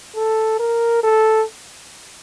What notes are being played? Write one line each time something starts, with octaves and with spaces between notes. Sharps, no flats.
A4
A#4
A4